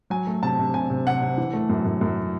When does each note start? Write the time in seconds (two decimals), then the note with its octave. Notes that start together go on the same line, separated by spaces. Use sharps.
0.10 F#3 G#5
0.27 A3
0.43 C3 A5
0.59 C3
0.74 C3 G#5
0.90 C3
1.06 C3 F#5
1.22 C3
1.38 E3
1.53 A3
1.69 F#2
1.85 F#2
2.01 F#2